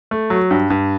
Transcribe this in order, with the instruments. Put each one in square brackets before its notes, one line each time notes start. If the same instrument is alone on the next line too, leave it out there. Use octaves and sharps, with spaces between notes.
[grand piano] A3
F#3
G2
G2